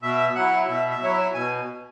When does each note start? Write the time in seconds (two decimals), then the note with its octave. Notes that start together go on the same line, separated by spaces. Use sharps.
0.02 B2 E5
0.35 F#3 E4 F#5
0.68 B2 E5
0.90 E5
1.01 F#3 E4 C#5
1.12 E5
1.34 B2 G#5